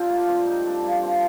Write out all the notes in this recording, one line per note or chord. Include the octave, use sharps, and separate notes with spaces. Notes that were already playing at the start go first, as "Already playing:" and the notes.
Already playing: A#2 C4 D4 F4 G4
A3 A#3
G3 C4
D3 D#4
D3 D4
G3 A#3
F3 C4